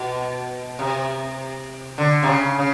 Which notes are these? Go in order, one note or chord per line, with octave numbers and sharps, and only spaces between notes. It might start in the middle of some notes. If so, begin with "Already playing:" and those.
Already playing: B2
C3
D3
C3
C#3
C#3